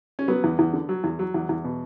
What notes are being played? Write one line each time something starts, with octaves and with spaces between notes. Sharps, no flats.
C#4
F#3 B3
E2
E2
D3
F#3
E2
F#3
E2
E2
B2